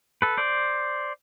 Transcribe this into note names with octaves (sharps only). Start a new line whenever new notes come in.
A4 B4
C5 D5